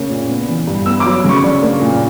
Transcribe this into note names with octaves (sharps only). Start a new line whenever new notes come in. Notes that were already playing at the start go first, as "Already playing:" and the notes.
Already playing: C#3 A#3 C#4
A#2
B3
E3
G2
B3 E6
D6
F#3
C#3 C#6
D4
A#3
A#2